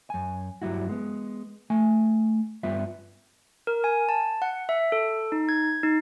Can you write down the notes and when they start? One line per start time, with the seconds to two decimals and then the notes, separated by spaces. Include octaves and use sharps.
0.10 F#2 G#5
0.62 G2 F#3 G3 E4 F#4
0.89 G#3 B3
1.70 A3 G#5
2.63 G2 G3 B3 F4 E5
3.67 A#4
3.84 G#5
4.09 A5
4.42 F#5
4.69 E5
4.92 A4
5.32 D#4
5.49 G#6
5.83 D#4